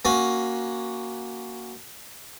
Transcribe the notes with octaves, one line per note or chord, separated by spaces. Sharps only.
A#3 C#4 F#4